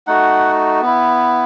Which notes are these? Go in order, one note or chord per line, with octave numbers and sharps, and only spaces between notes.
A3 D#4 F#4 F#5
B3 E4